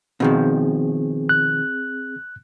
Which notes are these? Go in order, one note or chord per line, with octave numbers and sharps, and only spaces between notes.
B2 D#3 F3 C4 G#4
F#6